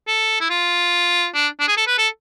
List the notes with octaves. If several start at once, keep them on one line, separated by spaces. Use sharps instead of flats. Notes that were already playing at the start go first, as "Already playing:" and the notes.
A4
E4
F4
D4
D4
G#4
A4
B4
A4